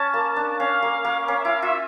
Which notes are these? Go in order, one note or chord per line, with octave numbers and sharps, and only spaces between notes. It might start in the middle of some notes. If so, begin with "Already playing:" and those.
Already playing: C#4 A5
A#3
D4
C#4 F5
A#3
A#3
C#4 F5
E5
E4 F5
F4 E5